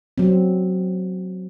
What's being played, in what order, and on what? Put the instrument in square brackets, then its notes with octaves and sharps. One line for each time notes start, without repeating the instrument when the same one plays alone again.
[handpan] F#3 C4